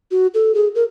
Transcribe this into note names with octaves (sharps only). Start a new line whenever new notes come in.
F#4
A4
G#4
A#4